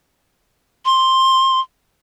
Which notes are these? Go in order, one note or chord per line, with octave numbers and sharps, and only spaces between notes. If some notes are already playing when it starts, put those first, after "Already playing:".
C6